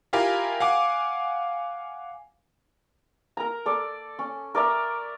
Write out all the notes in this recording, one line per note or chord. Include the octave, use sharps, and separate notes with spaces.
E4 F4 G4 A#4 F5 G#5
F5 F#5 G#5 D6
A#4 A#5
A4 D5
C#4
A#4 D5 E5 A#5